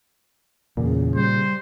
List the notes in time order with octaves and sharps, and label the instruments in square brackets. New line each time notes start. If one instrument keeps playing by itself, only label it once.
[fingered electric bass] E2 [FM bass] A#2 [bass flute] C#3
[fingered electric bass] G3 [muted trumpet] C5